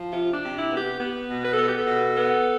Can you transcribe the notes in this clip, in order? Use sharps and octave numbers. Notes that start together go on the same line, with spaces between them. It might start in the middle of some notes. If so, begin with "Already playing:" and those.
Already playing: F3
C3 F4
D4
C3
E4
B3
G4
B3
B2
B4
B3 A4
G4
A4
B2
B3